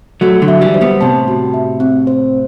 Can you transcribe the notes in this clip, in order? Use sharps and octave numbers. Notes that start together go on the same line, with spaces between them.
F#3 A3 F#4
D3 F#3
E5
E3 G3
C5
G3 B3
A2 C3 A5
F#4
E5
C4
C5